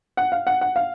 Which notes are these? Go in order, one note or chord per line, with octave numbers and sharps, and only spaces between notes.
F#5
F5
F#5
F#5
F5